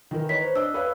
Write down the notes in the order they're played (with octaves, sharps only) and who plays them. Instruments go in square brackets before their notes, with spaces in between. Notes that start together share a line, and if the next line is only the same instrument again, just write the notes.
[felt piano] D#3 E3 A#4
[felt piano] D#4 B4 C#5 [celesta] B6
[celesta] C5
[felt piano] D4 D#5 [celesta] E6
[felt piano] B4 C#5 F5